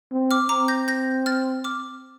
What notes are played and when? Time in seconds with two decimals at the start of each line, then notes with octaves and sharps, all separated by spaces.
0.12 C4
0.31 D6 F6
0.49 C4 A#5 D6
0.68 G6 A#6
0.88 G6 A#6
1.26 F6 A6
1.64 D6 F6